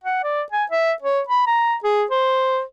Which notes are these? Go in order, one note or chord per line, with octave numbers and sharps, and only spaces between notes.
F#5
D5
G#5
E5
C#5
B5
A#5
G#4
C5